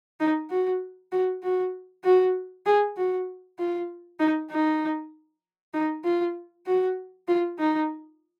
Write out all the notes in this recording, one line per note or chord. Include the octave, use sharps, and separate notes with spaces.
D#4
F#4
F#4
F#4
F#4
G#4
F#4
F4
D#4
D#4
D#4
F4
F#4
F4
D#4